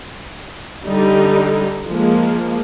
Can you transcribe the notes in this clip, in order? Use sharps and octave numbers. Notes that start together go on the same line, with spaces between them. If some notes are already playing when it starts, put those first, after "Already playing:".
D3 G3 D#4
F3 G#3 A#3